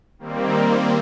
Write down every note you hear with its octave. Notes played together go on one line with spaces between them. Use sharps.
D#3 G3 A#3 C4